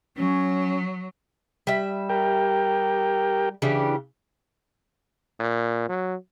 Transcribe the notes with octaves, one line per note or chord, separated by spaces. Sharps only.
F#3 C#4
G3 E5
G4 A#4 G5
C#3 E3 D4 G4
A#2
F#3